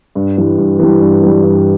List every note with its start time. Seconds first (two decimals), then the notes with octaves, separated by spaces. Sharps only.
0.15 G2
0.37 E3 G3
0.58 G2
0.79 E3 G3
1.01 G2
1.21 E3
1.27 G3
1.43 G2